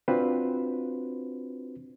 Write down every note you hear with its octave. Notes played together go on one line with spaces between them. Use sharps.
C4 D4 F4 F#4 B4 C5